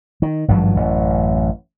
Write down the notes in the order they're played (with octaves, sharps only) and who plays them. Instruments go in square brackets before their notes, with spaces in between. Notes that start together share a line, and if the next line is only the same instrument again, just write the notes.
[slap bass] D#3
G#1 G2 F3 F#3
A1 F#2